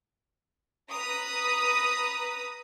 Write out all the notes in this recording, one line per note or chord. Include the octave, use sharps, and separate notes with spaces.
B4 A#5 D#6